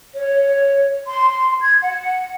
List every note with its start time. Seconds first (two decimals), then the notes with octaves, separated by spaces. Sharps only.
0.14 C#5
1.07 C6
1.61 G#6
1.82 F#5